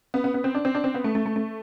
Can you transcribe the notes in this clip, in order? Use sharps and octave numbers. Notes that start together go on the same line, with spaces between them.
B3
B3
B3
C4
D4
C4
D4
C4
B3
A3
A3
A3
A3